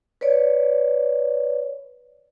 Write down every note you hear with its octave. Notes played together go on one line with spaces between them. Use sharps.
B4 C#5 D5